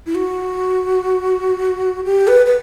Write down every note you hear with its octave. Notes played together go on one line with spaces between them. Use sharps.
E4
F#4
G4
B4
B4